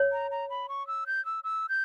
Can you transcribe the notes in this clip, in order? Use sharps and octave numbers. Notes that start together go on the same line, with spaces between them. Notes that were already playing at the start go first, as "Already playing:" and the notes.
Already playing: C#5
A#5
A#5
B5
C#6
E6
G6
E6
E6
G6